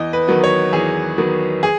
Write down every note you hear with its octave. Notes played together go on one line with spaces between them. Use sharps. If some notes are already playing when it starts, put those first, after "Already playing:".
Already playing: E2 D#5
B4
D#3 F#3 B3
C#5
E2 G#4
D#3 F#3 B3
G#4